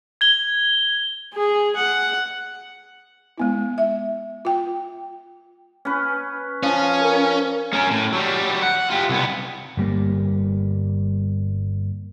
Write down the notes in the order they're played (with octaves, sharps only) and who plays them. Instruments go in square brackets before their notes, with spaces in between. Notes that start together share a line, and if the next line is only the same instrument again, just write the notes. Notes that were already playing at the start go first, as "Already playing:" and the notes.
[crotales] G#6 G7
[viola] G#4
F#5
[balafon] G#3 B3 E4
E5
F4 G5
[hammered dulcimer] C#4 B4
[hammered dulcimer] F3 [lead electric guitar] C#4
[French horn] A#4
[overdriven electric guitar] C#4 A#4
A2
F#3 G3
F#5
F4 G4
C2 B3
[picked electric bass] G1 G3 A#3